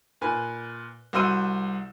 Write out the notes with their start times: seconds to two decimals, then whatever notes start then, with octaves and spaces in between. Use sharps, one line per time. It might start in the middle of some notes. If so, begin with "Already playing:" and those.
0.21 A#2 B4 G#5
1.13 C2 F#4 C5 E6 D#7